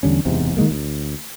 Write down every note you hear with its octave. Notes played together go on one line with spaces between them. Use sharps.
E2 D3 G3 C#4
F#1 E2 G#2 C3
D#3 F#3 G#3 A#3
D2